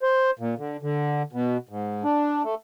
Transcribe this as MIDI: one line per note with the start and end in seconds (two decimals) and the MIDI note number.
0.02 0.31 72
0.39 0.54 46
0.58 0.77 50
0.82 1.23 50
1.33 1.57 47
1.69 2.03 44
2.04 2.43 62
2.44 2.55 57